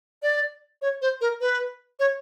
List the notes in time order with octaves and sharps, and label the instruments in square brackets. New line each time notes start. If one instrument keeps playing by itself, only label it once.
[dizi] D5
C#5
C5
A#4
B4
C#5